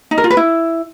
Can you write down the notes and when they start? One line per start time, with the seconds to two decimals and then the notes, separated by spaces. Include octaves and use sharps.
0.11 D#4
0.18 A#4
0.24 F4
0.30 B4
0.37 E4